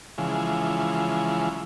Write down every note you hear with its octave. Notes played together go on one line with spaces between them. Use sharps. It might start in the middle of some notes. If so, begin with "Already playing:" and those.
C#3 E3 F3 G#3